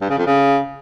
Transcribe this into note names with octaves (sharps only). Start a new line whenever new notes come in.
G2
C#3
F2
C#3